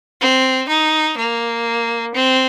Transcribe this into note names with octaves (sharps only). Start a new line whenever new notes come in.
C4
D#4
A#3
C4